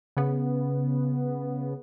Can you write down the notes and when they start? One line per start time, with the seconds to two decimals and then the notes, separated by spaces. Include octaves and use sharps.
0.17 C#3 B3